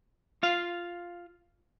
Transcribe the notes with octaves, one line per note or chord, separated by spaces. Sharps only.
F4 F5